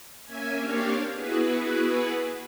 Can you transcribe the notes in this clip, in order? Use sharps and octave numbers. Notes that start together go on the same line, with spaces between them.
A#3 C#4 E5 G#5
A#3 C4 D4 G4 C#5 F5
B3 E4 F#4 G#4 B4